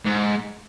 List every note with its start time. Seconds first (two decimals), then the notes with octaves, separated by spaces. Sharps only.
0.06 G#2